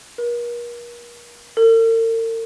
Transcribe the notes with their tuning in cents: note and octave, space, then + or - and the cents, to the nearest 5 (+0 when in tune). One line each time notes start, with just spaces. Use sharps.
A#4 +40
A#4 -45